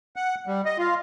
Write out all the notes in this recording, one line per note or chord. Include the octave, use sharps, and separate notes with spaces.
F#5
G3
D#5
F4